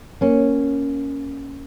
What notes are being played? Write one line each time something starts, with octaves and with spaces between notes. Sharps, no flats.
A#3 C#4